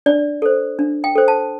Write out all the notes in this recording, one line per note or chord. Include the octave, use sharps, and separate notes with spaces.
D4 D5
A4 C5
D4
G5
A4 C5
A5